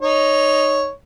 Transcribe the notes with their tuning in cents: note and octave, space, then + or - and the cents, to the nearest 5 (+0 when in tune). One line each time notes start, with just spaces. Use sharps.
D#4 -5 C#5 +0